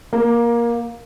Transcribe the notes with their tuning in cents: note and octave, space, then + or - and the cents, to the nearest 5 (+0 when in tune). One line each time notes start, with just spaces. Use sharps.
A#3 +15